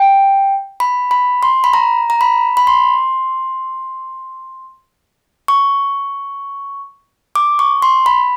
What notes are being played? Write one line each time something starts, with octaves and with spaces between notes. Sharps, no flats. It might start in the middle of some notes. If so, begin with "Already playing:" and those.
Already playing: G5
B5
B5
C6
B5
A#5
A#5
B5
B5
C6
C#6
D6
C#6
C6
B5